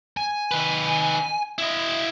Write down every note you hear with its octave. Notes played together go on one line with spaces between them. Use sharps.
G#5
D#3 B4
E4 D#5